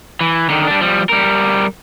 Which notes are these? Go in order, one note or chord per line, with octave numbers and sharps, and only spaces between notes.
E3
D3 D#3
G3 D4
F3 G3
G3 A#4